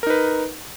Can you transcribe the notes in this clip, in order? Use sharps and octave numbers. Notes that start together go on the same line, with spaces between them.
D#4 A#4 B4